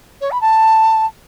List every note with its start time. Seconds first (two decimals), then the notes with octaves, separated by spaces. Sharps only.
0.21 C#5
0.31 B5
0.41 A5